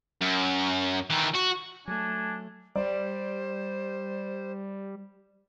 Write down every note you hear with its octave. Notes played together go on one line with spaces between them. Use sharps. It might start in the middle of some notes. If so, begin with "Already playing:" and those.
F#2
D#3 E3
F#4
F#3 A3 D4 G#5
G3 C5 D5